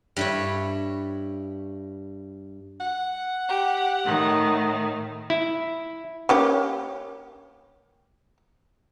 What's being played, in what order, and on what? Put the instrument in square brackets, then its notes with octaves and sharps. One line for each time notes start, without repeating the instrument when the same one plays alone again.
[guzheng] G2 E4 C#5
[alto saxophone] F#5
[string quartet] G4
A2 D#3
[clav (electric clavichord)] E4
[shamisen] A#3 C#4 G4